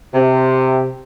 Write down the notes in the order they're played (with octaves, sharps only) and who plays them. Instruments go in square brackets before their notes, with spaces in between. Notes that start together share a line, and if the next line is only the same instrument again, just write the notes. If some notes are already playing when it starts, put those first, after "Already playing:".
[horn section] C3